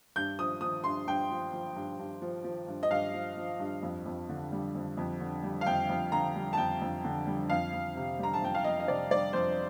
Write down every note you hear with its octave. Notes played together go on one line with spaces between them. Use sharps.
G2 G6
F3 D#6
F3 D#6
G2 C6
G2 G5
F3
F3
G2
G2
F3
F3
G2
D#5
G2 F5
F3
F3
G2
F2
F2
D3
G3
F2
F2
D3
G3
F5
F2 G5
F2
D3 A#5
G3
A5
F2 G5
F2
D3
G3
F2 F5
F2
C3
G3 A#5
A5
F2 G5
F5
F2 D#5
D#5
C3 D5
G3 D5
F2 C5